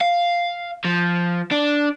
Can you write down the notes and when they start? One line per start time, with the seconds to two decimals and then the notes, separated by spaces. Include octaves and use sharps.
0.01 F5
0.85 F3
1.52 D4